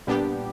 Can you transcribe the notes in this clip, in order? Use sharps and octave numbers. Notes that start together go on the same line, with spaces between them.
A#2 G3 B3 D4 G4